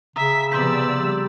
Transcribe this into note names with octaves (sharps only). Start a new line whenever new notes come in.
C#3 E5 A#5 D#6 B6
C3 F3 B3 D5 C6 E6 G6 B6
G3